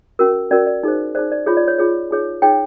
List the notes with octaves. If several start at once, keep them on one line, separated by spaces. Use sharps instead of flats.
C#4 F#4 A#4
C#4 F#4 A#4 D5
D5
D#4 G#4 C5
D#4 G#4 C5 D5
D5
F4 G#4 C#5
D5
C#5
F4 G#4 C#5
D#4 G#4 C#5
D#4 G#4 C#5 G5